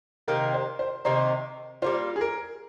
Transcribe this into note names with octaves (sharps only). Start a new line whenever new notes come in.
C3 D#3 A#3 D#4 A#4
C5
C5
C3 D#3 A#3 D#4 C5
G3 A#3 F4 C5
G#4
A#4